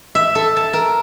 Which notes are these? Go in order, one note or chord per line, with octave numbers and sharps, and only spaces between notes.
E5
A4
A5
A#4